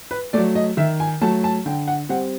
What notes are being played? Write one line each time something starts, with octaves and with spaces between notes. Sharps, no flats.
B4
F#3 A3 D5
D#5
D#3 E5
G#5
F#3 A3 A5
A5
D3 G5
F#5
G3 C4 F#5